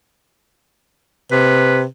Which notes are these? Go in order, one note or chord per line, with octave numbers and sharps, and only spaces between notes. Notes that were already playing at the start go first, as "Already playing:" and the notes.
C3 B4